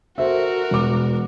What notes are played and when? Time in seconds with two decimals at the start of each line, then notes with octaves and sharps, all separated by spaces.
0.18 F#4 A4 A#4 C5 E5
0.71 E1 D6